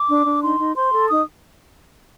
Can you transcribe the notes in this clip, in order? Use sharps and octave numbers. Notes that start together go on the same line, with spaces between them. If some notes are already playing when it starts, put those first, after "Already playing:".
Already playing: D6
D4
D4
D#4 C6
D#4
C5 C6
A4
D#4 D#6